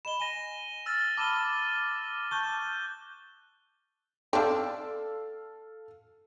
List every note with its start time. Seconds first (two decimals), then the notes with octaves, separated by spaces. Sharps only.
0.05 D#5 B5 E7 G7
0.20 G#5 A#6 D#7 G7
0.86 E6 F6 A6
1.17 A5 B5 D6 E6 D#7 G7
2.31 A5 C#6 F#6 G6 G7
4.33 C4 D4 A4 F5